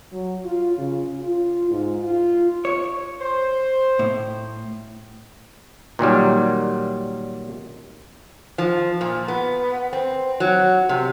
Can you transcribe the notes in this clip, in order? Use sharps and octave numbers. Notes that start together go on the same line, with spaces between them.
F#3
F4
C#3
F4
G#2
F4
C#5
C5
A2
A#2 D#3 F#3 G3
F3
A#2
B3
C4
F#3
C3